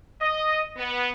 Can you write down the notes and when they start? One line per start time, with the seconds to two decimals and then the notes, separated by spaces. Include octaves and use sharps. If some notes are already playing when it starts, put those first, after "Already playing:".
0.21 D#5
0.77 B3